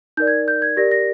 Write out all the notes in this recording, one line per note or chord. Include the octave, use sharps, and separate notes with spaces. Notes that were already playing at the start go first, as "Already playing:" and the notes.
D#4 A#4 D5 G6
G#6
G6
G#6
G4 A#4 D5 A#6
A#6